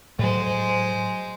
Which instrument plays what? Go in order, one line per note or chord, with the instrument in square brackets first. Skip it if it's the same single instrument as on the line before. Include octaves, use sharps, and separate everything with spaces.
[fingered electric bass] A2 F#3 [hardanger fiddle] G#3 C5